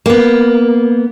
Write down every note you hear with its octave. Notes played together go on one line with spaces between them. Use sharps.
A#3 B3